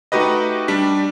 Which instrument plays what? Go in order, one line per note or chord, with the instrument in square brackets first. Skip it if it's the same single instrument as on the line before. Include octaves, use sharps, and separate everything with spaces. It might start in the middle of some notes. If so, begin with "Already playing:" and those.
[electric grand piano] A3 D#4 F#4 G4 B4 D#5
G3 D4 B6